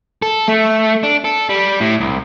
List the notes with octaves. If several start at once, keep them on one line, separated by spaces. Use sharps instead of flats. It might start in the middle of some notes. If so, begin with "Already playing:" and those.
A4
A3
D4
A4
G3
A2
C2